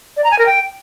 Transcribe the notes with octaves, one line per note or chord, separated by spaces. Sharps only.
D5
A#5
G#5
A#4
G5